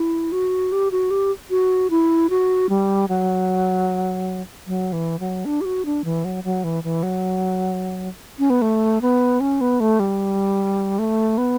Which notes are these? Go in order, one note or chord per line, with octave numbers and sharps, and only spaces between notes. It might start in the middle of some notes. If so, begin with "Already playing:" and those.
Already playing: E4
F#4
G4
F#4
G4
F#4
E4
F#4
G3
F#3
F#3
E3
F#3
D4
G4
F#4
D4
E3
F#3
F#3
E3
E3
F#3
C#4
B3
A3
B3
C#4
B3
A3
G3
A3
B3